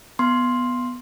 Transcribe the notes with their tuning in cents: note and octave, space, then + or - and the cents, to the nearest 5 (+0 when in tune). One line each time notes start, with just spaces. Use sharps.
B3 +0 C6 +5